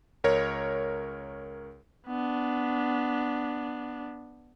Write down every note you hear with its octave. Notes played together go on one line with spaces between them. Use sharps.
C#2 A#4 C#5
B3 D4